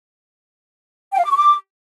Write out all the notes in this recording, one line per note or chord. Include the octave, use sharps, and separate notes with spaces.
G5
F5
D6
C#6
D6